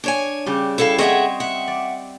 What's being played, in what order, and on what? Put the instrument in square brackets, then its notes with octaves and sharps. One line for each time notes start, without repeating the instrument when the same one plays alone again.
[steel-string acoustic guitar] D4 C#5 G#5
[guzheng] C#3 G3 G4
[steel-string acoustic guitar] E4 A4 F5
[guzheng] C4 C#5 D#5 [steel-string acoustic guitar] G#4 E5 F#5
[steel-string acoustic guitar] E5 F#5
[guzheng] D5